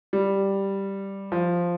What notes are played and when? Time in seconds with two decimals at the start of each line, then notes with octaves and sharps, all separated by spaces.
0.13 G3
1.32 F3